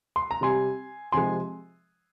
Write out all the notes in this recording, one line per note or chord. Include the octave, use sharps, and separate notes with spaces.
C6
A#5
C3 G3 G#5 C6
C3 F3 G#3 G#5 C6